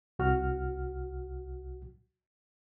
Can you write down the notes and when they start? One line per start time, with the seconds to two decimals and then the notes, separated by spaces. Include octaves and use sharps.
0.19 C2 F#4 F6